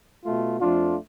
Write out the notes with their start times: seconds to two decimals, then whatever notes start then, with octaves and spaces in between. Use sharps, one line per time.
0.23 B2 A3 F4
0.59 F2 F3 A3 D4 F4